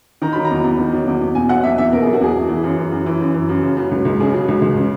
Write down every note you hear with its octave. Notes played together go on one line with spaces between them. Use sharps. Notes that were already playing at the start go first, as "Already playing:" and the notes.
D#3 A#5
F#3 B5
A#5
E2
E2
D#3
F#3
E2
E2
B2 G#5
F#3 F#5
E2 E5
E2 E5
B2 A#4
F#3 G#4
F#4
E2 G#4
E2
E3
F#2
E3
F#2
E3
F#2
E3
F#2
C#3
F#3
C#2
C#2
C#3 G#4
F#3
C#2
C#2
C#3